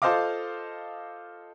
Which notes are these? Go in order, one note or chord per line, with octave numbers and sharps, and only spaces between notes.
F4 A4 C5 D#5 F5 D6